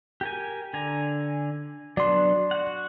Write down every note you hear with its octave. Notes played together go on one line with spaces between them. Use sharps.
G4 A#4 G#5
D3 G#5 A#5
F#3 B3 D4 D5 C6
F#4 F#5